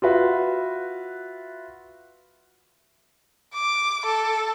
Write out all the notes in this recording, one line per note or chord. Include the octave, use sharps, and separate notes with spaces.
F4 F#4 B4 E5
D6
A4